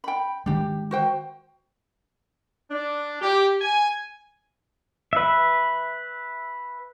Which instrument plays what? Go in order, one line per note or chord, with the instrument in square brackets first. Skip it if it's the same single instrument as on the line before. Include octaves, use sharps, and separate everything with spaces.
[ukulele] G5 B5
[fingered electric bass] D#3 G#3 [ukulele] D4 G4
[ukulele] F#4 C5 G5
[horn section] D4
G4
G#5
[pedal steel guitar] B4 E5